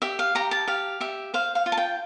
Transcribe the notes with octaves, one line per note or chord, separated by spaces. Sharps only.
G4 E5
F5
G4 A#5
A5
G4 F5
G4 E5
C5 F5
F5
F4
A5
G5